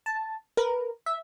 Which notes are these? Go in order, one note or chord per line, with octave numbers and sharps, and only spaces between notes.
A5
A#4 B4
E5